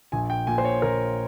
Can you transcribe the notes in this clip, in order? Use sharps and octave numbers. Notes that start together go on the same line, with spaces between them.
A#1 G#5
G5
A#2 G#5
C5
C#5
A#1 A#4